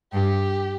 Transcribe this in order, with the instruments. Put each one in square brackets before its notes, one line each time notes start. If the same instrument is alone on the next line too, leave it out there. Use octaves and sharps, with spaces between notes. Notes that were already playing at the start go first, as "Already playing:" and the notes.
[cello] G2 [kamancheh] G4